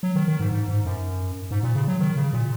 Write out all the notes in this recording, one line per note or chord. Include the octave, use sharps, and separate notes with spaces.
F#3
D#3
D#3
G#2
G#2
G#2
F#2
G#2
A#2
C#3
F#3
D#3
C#3
A#2